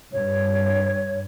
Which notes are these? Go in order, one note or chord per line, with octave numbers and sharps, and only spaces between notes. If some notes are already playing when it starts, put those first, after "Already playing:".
G2 C#5